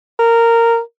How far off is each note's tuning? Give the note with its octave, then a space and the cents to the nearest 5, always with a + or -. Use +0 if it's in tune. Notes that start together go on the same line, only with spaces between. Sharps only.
A#4 -10